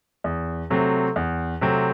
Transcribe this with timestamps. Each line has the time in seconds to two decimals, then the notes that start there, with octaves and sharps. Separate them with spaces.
0.24 E2
0.70 C3 F#3 A3 C4
1.16 E2
1.61 C3 F#3 A3 C4